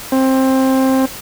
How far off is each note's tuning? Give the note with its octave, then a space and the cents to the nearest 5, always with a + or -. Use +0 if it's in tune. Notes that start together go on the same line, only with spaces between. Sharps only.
C4 +15